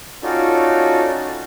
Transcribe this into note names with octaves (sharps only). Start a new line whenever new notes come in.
C#4 D#4 F4 F#4 A4 D5